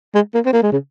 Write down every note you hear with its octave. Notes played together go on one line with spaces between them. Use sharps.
G#3
A#3
C4
A#3
G#3
C#3